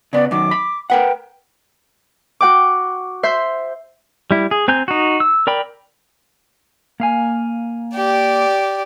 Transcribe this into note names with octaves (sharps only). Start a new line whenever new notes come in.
C#3 B3 D5
F#2 D#3 D6
B5
A#4 B4 F#5 G5
F#4 F#5 G5 D6
C5 E5 C6 G6
G3 E4
G#4
C4 G#5 A#5 G6
D#4 F#4
E6
A#4 D5 G5 B5
A#3 F5 G#5
G4 D5